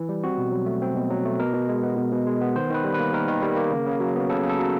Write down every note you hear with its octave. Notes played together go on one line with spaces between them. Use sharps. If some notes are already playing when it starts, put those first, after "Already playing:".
Already playing: E3
G3
C4 F#4
B2
F#3
A3
C4
B2
F#3
A3
B2 A#4
B2
G#3
B3
B2
B2
G#3
B3
D#3 C5
D#3 B4
G3
A#3 B4
D#3 A#4
D#3
G3
A#3
C#3
C#3
F#3
B3
C#3 A4
C#3
A4
F#3